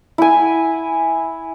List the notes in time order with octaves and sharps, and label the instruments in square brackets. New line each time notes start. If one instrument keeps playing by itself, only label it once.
[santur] E4 G#5